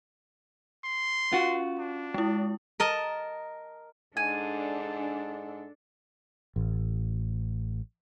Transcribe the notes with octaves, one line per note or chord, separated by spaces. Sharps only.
C6
C#4 F4 F#4
D4
G#3 E4
A#4 D#5 A5
G#2 D4 A4 G#5
A1